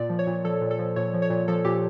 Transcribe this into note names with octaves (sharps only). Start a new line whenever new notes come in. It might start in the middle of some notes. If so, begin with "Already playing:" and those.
Already playing: A#2 D5
F3
C#5
A#2
F3 A4
A#2
A4
F3
A#2 C#5
F3
C#5
A#2
F3 A4
A#2 G4